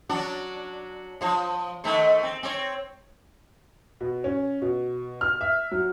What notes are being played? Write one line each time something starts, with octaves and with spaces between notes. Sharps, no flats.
F#3 D4 F#4
F3 C5
D#3 A3 C5
C4
C4 C#5
B2
C#4
B2
F6
E5
F#3